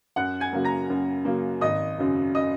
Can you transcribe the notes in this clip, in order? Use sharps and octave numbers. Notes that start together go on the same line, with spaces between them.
F#2 F#5 F#6
G#5 G#6
C#3 F#3 A#3
A#5 A#6
F#2
C#3 F#3 A#3
G#1 D#5 D#6
F#2 C#3 F#3
D#5 D#6